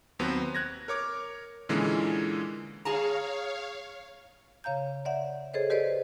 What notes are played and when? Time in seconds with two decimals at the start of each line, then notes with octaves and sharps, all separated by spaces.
0.19 D#2 F#3 B3 C4
0.55 F#6 G#6 A#6
0.88 A#4 C#5 D6
1.69 A#2 D3 E3 G#3 A#3 C#4
2.85 G#4 C#5 F5 A5 A#5
4.64 C#3 C#5 F5 A#5 G6
5.05 D5 E5 F#5
5.54 G#4 A4 C5 C#5 D#5
5.70 G4 B4 C5 D5 D#5